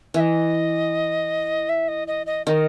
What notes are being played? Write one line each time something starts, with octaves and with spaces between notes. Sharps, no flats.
E3 E5
D#5
E5
D#5
D#5
D#5
D#3 D#5